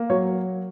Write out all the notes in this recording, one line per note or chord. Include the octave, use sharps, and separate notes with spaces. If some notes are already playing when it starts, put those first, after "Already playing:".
Already playing: A#3
F#3 C#5